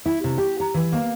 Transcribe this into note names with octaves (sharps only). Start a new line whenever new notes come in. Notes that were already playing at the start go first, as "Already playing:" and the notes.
E4
C3
G4
A#5
E3
A#3